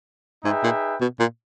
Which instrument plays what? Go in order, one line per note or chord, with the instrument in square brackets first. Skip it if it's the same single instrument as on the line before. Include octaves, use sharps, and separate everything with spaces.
[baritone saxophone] G#2 [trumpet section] D#4 G#4 B4 E5 G5
[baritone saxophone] A#2
B2
A#2